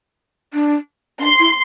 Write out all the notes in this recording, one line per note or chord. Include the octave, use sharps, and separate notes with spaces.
D4
C#4
D4 C6
E4